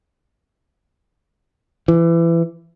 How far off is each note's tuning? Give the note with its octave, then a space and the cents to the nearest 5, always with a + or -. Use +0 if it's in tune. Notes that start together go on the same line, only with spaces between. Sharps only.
E3 +25